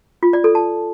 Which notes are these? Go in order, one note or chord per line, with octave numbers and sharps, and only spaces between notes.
F4
D5
A4
A5